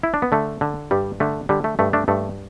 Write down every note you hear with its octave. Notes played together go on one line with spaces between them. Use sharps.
E4
D4
B3
D3 A3
D3
G2 G3
D3 A3
D3 G3
A3
G2 A3
A3 D4
G2 A3